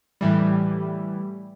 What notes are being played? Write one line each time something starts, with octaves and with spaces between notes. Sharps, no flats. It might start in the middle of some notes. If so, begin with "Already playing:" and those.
A2 E3 G3